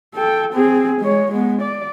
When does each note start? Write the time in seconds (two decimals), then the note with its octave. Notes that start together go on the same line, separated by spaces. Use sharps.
0.14 A4 G5
0.54 C4 G#4
1.01 G#3 C#5
1.32 G#3 B3
1.62 D5